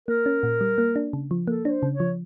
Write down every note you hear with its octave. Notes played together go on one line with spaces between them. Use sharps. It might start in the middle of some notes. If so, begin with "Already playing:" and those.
A#3 A#4
C#4
A#2
G3
A#3
D4
C#3
F3
A#3 A4
D4 C#5
C5
C#3
C#5
F3